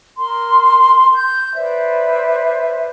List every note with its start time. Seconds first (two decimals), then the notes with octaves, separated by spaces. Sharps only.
0.19 A#4 C6
1.14 G6
1.55 B4 C5 D5 E5